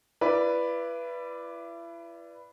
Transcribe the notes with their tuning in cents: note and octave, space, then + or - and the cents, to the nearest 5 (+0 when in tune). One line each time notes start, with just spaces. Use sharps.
E4 +40 B4 +0 D5 +0